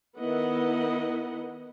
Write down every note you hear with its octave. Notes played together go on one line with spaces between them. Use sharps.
D#3 B3 E4 B4 D#5 F#5